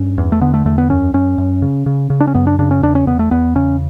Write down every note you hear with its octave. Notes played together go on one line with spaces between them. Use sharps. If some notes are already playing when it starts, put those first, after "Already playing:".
Already playing: G2 C#4
E2
A3
D3 B3
A3
E2 A3
B3
F#2 C#4
F#2 C#4
F#2
C#3
C#3
C#3
D4
C#4
F#2 B3
D4
C#3 D4
C#4
E2 D4
C#4
E2 B3
A3
E2 B3
C#3 C#4